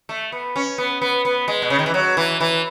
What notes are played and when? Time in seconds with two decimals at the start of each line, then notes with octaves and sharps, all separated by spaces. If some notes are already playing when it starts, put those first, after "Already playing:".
0.09 A3
0.32 B3
0.56 C#4
0.78 B3
1.02 B3
1.25 B3
1.48 G#3
1.62 B2
1.70 C#3
1.79 D#3
1.86 E3
1.94 F#3
2.17 E3
2.40 E3